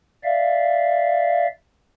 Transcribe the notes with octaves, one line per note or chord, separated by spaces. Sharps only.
D5 E5 F5